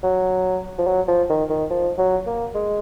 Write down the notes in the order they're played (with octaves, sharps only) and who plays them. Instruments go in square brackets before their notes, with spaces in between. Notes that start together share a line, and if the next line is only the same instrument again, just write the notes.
[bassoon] F#3
F3
F#3
F3
D#3
D#3
F3
F#3
A#3
G#3